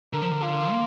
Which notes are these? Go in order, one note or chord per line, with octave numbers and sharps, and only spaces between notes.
D3 A#4
F3
D3
F4
A#3